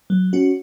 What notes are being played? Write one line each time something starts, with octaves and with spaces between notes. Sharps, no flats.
F#3
C#4 F#4